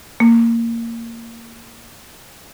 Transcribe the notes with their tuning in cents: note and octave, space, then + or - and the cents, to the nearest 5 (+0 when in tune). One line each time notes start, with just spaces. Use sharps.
A#3 -15